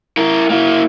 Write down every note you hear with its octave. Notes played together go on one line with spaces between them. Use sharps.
E4 A#4
A#3 E4